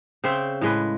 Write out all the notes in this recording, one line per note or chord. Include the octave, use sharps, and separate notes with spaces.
C#3 C4 C5 E5
A2 G#3 B4